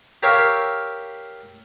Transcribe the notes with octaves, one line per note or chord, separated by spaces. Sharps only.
G4 A#4 C#5 E5 F5